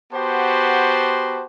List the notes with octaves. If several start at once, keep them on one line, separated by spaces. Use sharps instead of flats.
B3 F#4 G4 C5 A5 C6